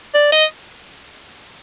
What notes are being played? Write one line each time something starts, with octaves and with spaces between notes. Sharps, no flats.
D5
D#5